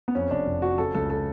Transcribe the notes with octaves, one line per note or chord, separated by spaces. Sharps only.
B3
F2 C#4
F1 D4
F1
F3 F#4
C#3 A4
C#2 A4
A4